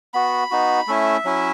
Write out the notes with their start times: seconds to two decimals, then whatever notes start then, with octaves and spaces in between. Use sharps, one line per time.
0.14 B3 F#4 B5
0.51 B3 D#4 F#4
0.87 A3 C#4 E4 E5
1.25 F#3 C#4 E4